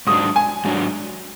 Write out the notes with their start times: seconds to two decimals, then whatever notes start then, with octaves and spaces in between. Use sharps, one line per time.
0.07 G#2 F#3 D4 D#6
0.36 G#5
0.65 G#2 F#3 D4